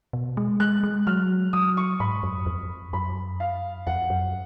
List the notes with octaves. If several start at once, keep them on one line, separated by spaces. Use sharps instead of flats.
B2
G#3
G#3 F#6
G#3
F#3 F6
F#3 D#6
C#6
G#2 B5
F#2
F2
F#2 B5
F5
F2 F#5
F#2